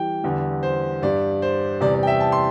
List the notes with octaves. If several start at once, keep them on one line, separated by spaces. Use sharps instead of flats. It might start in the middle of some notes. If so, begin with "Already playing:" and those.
Already playing: E3 G3 G5
E2 D3 G3
C5
G2 G3 D5
C5
E2 C3 G3 D5
D5
G5
E5
A5
C6